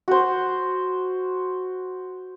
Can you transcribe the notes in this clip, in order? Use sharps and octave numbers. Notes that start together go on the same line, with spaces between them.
F#4 C5